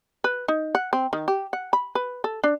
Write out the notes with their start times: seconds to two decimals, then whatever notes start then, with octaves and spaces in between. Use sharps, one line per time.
0.24 B4
0.48 D#4
0.75 F#5
0.93 C4
1.13 D#3
1.28 G4
1.53 F#5
1.73 B5
1.95 B4
2.24 A4
2.44 D4